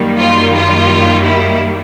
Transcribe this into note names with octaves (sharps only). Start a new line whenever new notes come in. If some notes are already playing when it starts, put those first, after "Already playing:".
Already playing: F#2 D#3 G3 A#3
F4
F4
E4